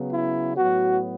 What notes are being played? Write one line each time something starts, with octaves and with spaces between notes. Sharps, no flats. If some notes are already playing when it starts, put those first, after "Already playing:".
Already playing: C#3 F#3 B3
E4
A2 F#3 B3 F#4